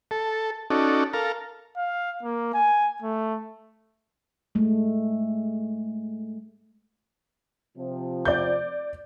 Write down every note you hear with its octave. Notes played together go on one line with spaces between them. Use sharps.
A4
C#4 D#4 F#4 A4 D5
A4 A#4 F5
F5
A#3
G#5
A3
G#3 A3
C3 F3
D5 G6